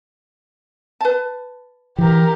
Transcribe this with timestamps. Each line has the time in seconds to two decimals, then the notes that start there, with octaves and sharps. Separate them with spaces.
1.00 B4 A5
1.98 E3 G4 A#4